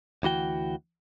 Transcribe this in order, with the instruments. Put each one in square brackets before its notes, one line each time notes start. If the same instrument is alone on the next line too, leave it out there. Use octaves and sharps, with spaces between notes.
[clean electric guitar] D2 E3 F#4 G5